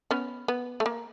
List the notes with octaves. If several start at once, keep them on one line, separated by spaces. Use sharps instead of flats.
B3 C#4
B3
A3
A#3